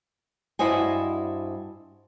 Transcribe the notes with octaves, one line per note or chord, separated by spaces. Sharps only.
G2 E4 F#4 C5 D#5 G#5